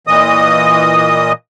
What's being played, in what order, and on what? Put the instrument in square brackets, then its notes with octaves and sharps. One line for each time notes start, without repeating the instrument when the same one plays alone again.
[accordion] A#2 E3 D#5 D#6